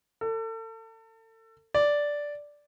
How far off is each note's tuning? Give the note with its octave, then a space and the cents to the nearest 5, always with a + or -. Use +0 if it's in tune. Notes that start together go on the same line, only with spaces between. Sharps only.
A4 +35
D5 -5